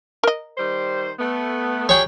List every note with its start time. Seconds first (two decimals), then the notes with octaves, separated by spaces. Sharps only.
0.24 A#4 D#5
0.58 D#3 G3 C5
1.19 A3 B3
1.89 F#3 G3 G#4 C#5 G5